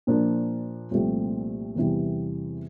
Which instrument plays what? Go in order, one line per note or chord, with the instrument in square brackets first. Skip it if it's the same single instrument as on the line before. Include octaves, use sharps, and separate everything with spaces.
[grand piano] A#2 F3 A#3 D4 F4
C2 A#2 F3 A3 C4
E2 C3 E3 G3